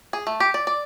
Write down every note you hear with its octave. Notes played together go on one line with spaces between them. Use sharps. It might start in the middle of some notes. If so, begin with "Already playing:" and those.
G#4
A3
G4
D5
D5